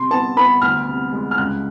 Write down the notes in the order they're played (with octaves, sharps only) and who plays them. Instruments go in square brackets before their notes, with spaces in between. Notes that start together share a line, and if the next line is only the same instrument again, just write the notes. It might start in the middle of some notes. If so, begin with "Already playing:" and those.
Already playing: [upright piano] C3 C6
B3 A5
B3 B5
D2 F6
C3
G#3
F6
C#2 F#6